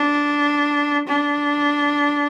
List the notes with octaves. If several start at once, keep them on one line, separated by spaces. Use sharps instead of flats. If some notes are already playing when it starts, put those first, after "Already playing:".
Already playing: D4
D4